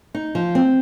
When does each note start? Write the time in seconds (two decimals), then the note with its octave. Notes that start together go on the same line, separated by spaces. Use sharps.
0.14 D#4
0.35 F3
0.55 C4